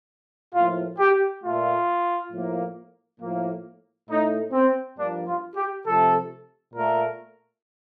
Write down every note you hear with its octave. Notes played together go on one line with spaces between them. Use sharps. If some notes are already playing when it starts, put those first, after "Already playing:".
A2 F3 A#3 F4
G4
A#2 A3 F4
A2 F3 A#3
A2 F3 A#3
A2 A3 D#4
C4
G2 F3 A#3 D4
F4
G4
C3 F3 A3 A4
A#2 A3 A#4